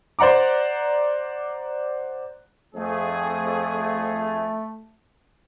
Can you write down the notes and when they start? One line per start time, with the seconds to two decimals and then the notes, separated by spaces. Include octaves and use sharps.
0.19 C5 D5 F#5 A#5 D6
2.75 F2 A3 G#4